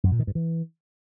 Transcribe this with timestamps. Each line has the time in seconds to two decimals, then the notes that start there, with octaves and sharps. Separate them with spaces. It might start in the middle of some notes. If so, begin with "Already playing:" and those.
0.04 F#2
0.12 A#2
0.19 D#3
0.27 G2
0.35 E3